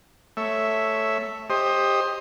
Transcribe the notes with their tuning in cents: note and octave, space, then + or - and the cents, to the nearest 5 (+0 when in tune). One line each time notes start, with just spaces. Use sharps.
A3 +0 C#5 +0 E5 +0
G4 +20 C5 +20 D#5 +0